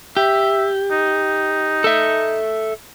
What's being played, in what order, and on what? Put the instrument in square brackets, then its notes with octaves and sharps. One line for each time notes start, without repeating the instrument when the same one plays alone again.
[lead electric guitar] G4 [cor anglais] E5
[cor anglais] D#4
[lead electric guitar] A4 E5